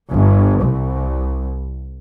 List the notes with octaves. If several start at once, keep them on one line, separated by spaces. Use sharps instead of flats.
G1
C2